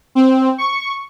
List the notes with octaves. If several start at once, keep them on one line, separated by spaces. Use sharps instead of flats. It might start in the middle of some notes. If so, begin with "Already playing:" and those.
C4
C#6